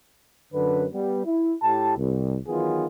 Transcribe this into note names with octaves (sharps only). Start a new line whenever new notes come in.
F#2 D3 B4
G3 B3
E4
A2 E4 G4 A5
C2
D#3 E3 F#3 B3 F4 G#4